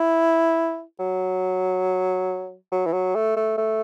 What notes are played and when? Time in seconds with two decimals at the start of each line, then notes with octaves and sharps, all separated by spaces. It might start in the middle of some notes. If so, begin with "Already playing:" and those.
Already playing: E4
0.99 F#3
2.72 F#3
2.86 E3
2.93 F#3
3.15 A3
3.36 A3
3.58 A3